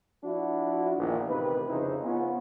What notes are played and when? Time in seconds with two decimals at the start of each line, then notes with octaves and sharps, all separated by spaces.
0.23 F3 D4 E4 F#4
0.98 A#1 E2 D#3 E3 D#4 F4
1.28 A1 C3 D#3 D#4 B4
1.68 F2 C#3 D#4 E4 C5
2.03 B3 C#4 F4